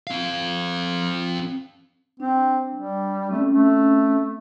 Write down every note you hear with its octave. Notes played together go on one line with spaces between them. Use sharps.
C4 F5
C4 D4
G3
A3 C4 C#4
A3